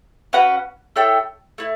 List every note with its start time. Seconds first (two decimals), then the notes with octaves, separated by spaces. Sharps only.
0.33 C#4 F#4 B4 F#5
0.96 E4 A4 C#5 G5
1.58 A3 E4